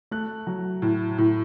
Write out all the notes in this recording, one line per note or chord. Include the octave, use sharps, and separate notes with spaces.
A3 F#6
F#3
A2
A2